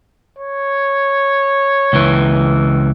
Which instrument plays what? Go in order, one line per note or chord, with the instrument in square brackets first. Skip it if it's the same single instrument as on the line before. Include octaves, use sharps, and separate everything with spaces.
[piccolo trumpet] C#5
[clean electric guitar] C#2 E3